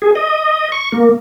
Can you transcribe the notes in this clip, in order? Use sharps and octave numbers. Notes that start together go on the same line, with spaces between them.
G#4
D#5
C#6
A#3